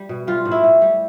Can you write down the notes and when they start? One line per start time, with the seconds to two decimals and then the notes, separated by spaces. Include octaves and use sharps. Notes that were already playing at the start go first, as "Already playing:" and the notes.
Already playing: G3
0.09 B2
0.27 G3 F4
0.45 A2
0.51 E4
0.64 A2
0.82 G3